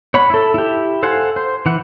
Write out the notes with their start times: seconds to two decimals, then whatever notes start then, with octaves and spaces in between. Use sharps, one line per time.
0.14 C#5 F#5 B5
0.30 E4 A4
0.54 E4 G4
1.03 A4 C5 F5 F#5 G#5
1.36 C5
1.66 E3 F#5